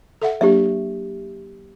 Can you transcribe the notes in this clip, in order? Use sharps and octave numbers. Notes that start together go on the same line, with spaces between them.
A4 E5 F#5
F#3 A#3 D4 G4 E5